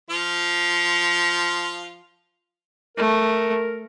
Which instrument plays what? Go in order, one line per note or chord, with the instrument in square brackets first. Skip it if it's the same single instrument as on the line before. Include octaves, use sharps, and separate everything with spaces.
[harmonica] F3 F4
[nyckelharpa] A3 [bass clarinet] A#4